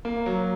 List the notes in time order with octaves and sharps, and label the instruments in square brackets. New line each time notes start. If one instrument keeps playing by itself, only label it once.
[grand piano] A#3
F#3